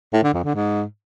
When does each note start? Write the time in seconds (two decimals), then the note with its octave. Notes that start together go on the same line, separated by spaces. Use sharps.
0.13 A2
0.24 D3
0.34 F2
0.44 D3
0.55 G#2